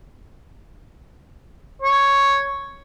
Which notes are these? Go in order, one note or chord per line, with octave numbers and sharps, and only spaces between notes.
C#5